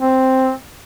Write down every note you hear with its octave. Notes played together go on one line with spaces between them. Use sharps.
C4